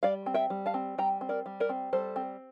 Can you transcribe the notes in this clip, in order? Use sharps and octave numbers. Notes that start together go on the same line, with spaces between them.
G3 D5 F5
C4
E5 G5
G3
F5 A5
C4
G3 G5 A#5
C4
A#4 D5
G3
A#4 D5
C4
G3 A4 C5
C4